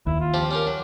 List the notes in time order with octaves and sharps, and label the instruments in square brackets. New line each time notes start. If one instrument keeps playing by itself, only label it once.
[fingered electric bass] D#2 [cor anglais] E4
[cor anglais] F4
[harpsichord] F3 C4 G4
[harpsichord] C#4 F4 A#4 [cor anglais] G4
[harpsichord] F#3